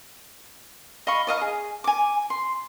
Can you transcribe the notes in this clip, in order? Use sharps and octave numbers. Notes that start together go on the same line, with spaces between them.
D#5 F5 B5 C#6
D5 D#5 F5 A#5
G#4
G#5 D6
C6